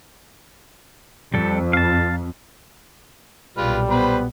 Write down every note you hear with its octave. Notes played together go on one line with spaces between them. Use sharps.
F2 G3 A4
F5 A5
B1 A#2 G3 F4 B4 F6
B3 B4 C5 B5